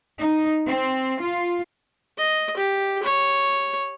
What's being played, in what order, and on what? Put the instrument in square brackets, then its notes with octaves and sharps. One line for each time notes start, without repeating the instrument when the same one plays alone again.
[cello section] D#4
C4
F4
[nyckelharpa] D#5
G4
C#5